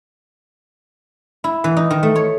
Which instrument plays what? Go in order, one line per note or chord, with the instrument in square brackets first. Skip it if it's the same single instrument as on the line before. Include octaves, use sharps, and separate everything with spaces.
[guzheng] E4
E3
D#4
D#3
A3
C#5